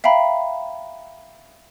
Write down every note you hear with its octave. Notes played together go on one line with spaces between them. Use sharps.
E5 F5 G5 A#5 B5